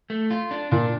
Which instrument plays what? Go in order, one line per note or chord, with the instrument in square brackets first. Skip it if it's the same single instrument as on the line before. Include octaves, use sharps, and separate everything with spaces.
[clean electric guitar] A3
F4
D4
[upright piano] A#2 [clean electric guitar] D4